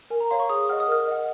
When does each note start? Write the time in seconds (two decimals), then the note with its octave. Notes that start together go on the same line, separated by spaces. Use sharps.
0.10 A#4 G#5
0.20 A#5
0.30 C#5 F5 C6
0.40 C#6
0.49 G#4 D#6
0.69 D#5 F#5 F6
0.80 D#6
0.88 A#4 F6
1.07 D#5 F#5